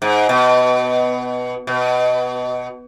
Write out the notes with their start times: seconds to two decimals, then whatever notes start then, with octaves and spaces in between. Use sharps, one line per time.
0.02 G#2
0.29 B2
1.67 B2